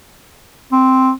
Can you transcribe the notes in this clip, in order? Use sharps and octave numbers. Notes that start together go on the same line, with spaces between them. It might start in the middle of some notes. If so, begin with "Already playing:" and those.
C4